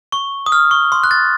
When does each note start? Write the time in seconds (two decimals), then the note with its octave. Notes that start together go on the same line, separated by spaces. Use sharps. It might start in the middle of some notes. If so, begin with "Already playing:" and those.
0.12 C#6
0.46 D#6
0.52 F6
0.71 C#6
0.92 C6
1.04 F#6
1.11 A6